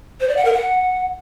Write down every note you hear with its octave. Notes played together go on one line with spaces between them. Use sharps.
C5
D5
F#5
A#4
F#5